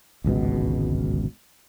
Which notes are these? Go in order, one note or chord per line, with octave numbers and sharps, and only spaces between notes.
D1 G#1 C#2 B2